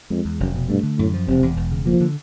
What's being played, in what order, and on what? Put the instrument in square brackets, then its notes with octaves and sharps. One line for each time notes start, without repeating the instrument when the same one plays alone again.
[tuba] F2 [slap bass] G#3
[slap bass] E2
[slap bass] F1 [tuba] F#2
[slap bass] B2
[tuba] G2 [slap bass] A3
[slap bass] D3
[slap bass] F#2 [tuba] A2
[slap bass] F3
[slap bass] E1 [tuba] C3
[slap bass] E2
E1
C#3
[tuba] F3 [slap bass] A#3
[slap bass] D3